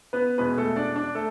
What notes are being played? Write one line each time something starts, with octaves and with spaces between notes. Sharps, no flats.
B3 B4
E2 B2 G#3 B3 B4
A3 A4
D4 D5
D4 D5
A3 A4